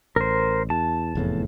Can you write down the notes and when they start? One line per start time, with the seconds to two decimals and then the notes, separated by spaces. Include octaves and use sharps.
0.16 A1 A#4 C5
0.70 E2 A5
1.15 F1 E2 A2